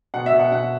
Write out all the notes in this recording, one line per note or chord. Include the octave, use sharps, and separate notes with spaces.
B2 F#5
E5
B2
F#5
B2 F#5